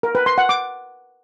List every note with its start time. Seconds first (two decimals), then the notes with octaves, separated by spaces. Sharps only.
0.03 A#4
0.15 B4
0.26 C6
0.38 F#5
0.49 D6